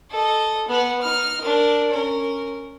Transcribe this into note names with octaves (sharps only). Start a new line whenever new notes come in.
A4 D#5
B3 B4
D#4 F6
D4 A#4
C#4 A#4